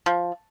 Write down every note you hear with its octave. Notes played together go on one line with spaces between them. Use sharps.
F3